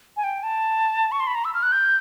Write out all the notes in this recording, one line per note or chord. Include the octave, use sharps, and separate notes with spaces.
G#5
G5
A5
C#6
C6
B5
A#5
E6
F6
F#6
G6